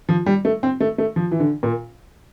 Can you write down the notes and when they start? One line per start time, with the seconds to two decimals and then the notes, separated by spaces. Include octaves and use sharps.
0.09 F3
0.26 G3
0.45 A3
0.63 C4
0.80 A3
0.98 A3
1.16 F3
1.31 E3
1.40 D3
1.63 A#2